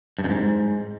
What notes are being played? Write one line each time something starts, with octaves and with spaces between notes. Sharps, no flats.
G2
F#2
G#2